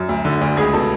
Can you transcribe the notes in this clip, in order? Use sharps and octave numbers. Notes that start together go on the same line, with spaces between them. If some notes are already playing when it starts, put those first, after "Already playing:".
Already playing: F#2
D2
D3
D2
C#2 G#4
B2 A4